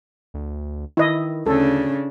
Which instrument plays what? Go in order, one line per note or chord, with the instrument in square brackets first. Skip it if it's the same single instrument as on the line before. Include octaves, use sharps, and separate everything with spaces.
[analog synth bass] D2
[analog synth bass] D#3 [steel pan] E4 D#5
[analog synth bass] D2 [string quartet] C#3 D4 [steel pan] A4